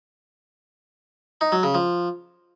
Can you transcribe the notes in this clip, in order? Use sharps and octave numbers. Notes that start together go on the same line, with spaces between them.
D#4
F#3
C#3
F3